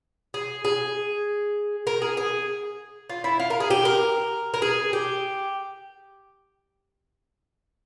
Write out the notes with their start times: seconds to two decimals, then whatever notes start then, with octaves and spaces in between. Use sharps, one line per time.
0.34 G#4
0.65 G#4
1.87 A#4
2.02 G#4
2.17 G#4
3.10 F4
3.24 E4
3.40 F4
3.50 A#4
3.60 G#4
3.71 G4
3.85 A#4
4.54 A#4
4.62 G#4
4.93 G4